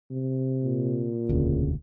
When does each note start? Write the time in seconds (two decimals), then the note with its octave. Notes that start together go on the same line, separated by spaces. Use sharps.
0.11 C3
0.64 A#2
1.29 E1 D2 C#3